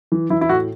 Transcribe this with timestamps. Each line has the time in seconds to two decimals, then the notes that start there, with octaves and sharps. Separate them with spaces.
0.12 E3
0.30 E3 E4
0.41 E4
0.49 A2 F#4